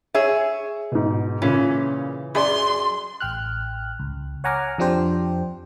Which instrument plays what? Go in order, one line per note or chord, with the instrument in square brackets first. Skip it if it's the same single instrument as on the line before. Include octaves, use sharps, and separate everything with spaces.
[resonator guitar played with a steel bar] G#4 E5 [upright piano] C#5
[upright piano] G#2 B2
[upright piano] A#2 C#3 [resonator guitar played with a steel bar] E3 C#4
[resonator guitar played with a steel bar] F#2 [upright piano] G#4 D5 [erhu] C6
[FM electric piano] A1 G5 F6 F#6
C#2
C#5 F#5 G#5 A#5 D6 F6
F2 F3 D4 G4 C5 G5